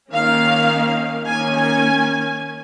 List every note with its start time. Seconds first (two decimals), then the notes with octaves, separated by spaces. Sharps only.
0.12 D#3 A#3 C#4 F5
1.27 D#3 A#3 C#4 G#5
1.56 G#5